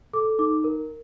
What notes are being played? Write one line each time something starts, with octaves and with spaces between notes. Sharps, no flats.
A4 D6
D#4 D6
A#4